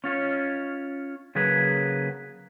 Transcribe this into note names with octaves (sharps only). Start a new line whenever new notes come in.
C#4 F4 C#5
C#3 F#3 A#3 G#4 B4